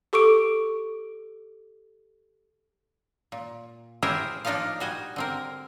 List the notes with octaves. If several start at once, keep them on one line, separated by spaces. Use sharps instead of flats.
G4 A4 C#6 D6 D7
A#2
E4 G4 G#4 A#4 C5 E5
F3 A#3 D4 D#4 F4 F5
G3 F#4 D#5 G#5
D3 C4 A#4